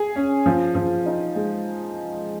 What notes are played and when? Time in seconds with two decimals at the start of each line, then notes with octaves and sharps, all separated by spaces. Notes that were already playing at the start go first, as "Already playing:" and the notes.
Already playing: G#4
0.16 C#4
0.46 F3
0.75 F3
1.06 D#4
1.35 G#3